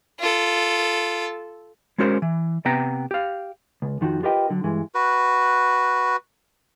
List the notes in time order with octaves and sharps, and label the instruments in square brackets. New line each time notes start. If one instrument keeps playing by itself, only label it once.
[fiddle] F4 A4
[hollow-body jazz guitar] G#3 C#4 F#4 A#4 C5
E3
C3 B3 G5 A#5
G4 F5
[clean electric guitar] C#2
F2 D#3 F3 F#4
F4 G4 A#4 B4 D#5 G5
D3 F#3
G2 E3 G#3
[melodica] F#4 B4